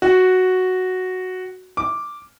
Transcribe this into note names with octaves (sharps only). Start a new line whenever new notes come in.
F#4
D6